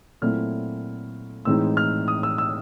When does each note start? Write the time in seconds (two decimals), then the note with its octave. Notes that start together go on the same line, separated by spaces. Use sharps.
0.22 A#2 F#3 A3 C4 E4 F6
1.45 A2 E3 G#3 C4 D#4 E6
1.77 F6
2.08 D#6
2.23 E6
2.38 E6